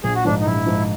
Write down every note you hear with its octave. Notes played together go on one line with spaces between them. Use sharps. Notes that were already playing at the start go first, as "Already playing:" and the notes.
A#1 G#4
F#4
G#2 F3 D4
D#4
A#1 E4
G#2 F3